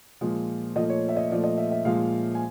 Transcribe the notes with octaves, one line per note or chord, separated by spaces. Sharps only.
A#2 F3 G#3
A#2 F3 A3 D#5
C#5
E5
D#5
A#2 F3 A3 D5
D#5
E5
E5
A#2 F3 G#3 F5
G#5